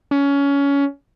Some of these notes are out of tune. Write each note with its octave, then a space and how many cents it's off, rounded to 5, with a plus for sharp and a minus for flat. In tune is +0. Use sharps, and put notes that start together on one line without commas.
C#4 +20